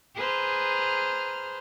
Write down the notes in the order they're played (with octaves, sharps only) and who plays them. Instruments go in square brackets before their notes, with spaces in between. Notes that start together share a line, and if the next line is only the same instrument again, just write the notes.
[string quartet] G#4 B4 C5 A#5 F6